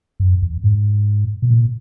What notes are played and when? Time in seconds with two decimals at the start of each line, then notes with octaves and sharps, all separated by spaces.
0.20 F#2
0.42 E2
0.64 G#2
1.42 B2
1.50 A#2